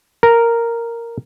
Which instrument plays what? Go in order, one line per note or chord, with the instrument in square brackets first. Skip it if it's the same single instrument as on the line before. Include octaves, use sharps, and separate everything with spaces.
[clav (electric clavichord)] A#4